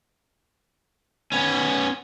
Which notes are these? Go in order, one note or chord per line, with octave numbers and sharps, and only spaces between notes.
B3 C#4